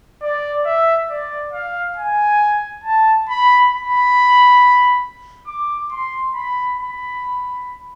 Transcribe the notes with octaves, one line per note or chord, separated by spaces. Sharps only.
D5
E5
D5
F5
G#5
A5
B5
B5
D6
C6
B5
B5